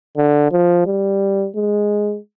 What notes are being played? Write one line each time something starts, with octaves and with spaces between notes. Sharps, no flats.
D3
F3
G3
G#3